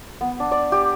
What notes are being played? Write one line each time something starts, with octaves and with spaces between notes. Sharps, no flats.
B3
D4
D5
G4